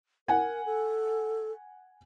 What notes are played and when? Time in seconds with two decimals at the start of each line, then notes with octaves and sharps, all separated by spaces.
0.28 A#4 F#5 G#5
0.66 A4